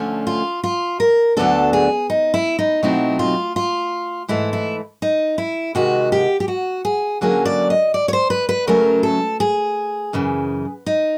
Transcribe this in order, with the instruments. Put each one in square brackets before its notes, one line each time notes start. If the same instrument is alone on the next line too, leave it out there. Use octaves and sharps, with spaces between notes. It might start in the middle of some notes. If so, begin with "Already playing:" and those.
Already playing: [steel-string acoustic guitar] D2 D3 F3 A3 C#4
F4
F4
A#4
D2 D3 F#3 B3 D4 A4
G#4
D#4
E4
D#4
B2 F#3 A3 C4 D#4 E4
F4
F4
G#2 E3 A3 E4
E4
D#4
E4
C3 D#3 G#3 F#4
G4
G4
F#4
G#4
D3 F#3 A#3 C#4 G#4
D5
D#5
D5
C#5
C5
B4
B4
C#3 F#3 A3 C#4 A#4
A4
G#4
F#2 C#3 E3
D#4